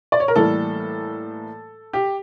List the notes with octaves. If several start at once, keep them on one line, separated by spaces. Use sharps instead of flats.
D5
C#5
A#4
A2 E3 G3 A#3 A4
G4